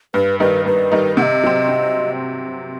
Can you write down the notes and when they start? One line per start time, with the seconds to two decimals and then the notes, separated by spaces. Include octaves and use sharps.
0.14 G2 B4
0.40 D#3 G3 D#4 B4
0.66 G2 B4
0.92 D#3 G3 D#4
1.17 C3 F#5
1.23 D#5
1.44 F#3 C4
1.69 C3